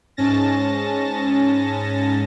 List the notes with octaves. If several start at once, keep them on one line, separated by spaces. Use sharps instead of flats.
G#2 C#4 A5 A6 A#6